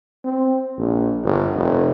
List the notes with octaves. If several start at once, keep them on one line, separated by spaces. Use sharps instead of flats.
C4
A#1
G1
F1